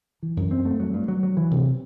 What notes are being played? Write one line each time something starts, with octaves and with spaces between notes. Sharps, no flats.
E3
F#2
C4
A3
F#3
G2
F#3
F#3
E3
C3